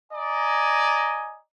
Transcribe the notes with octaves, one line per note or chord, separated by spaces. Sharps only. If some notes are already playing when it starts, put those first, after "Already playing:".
D5 D#5 G#5 A#5